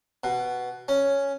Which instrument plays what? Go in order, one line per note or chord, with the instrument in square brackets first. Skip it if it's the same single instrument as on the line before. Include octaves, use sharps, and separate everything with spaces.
[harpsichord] B2
C#4